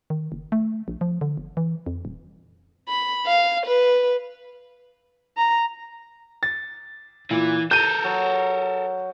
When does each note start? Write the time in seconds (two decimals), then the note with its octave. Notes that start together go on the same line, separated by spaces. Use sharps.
0.10 D#3
0.32 F#1
0.52 A3
0.88 A#1
1.01 F3
1.21 D3
1.37 G1
1.57 E3
1.86 F2
2.05 D#1
2.88 B5
3.26 F5
3.66 B4
5.38 A#5
6.43 A6
7.31 A#2 E3
7.71 A4 A#4 G6 D#7
8.04 F#3